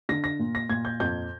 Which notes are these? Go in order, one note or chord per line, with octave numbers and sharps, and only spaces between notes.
D3 A#6
A#6
A#2
A#6
A#2 G#6
G6
F2 G6